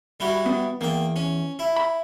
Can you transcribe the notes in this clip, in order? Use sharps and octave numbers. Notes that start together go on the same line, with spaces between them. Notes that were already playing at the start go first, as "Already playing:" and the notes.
G3 E4 F#4
B3
E2 A#3 G5
C#4
E4
B5